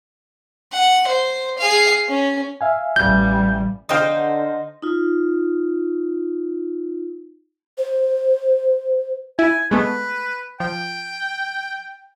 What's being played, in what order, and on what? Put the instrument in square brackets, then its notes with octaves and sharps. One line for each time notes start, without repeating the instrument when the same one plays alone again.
[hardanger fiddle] F#5
C5
G#4 F5
C#4
[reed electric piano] E5 F5 G#5
[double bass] A1 G3 [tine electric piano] G6
[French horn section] D3 [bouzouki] D#4 C5 [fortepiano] F5 G5 D#6
[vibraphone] D#4 F4
[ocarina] C5
[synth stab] E4 [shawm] G#5
[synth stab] G#3 A3 B3 [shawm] B4
[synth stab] F3 [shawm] G5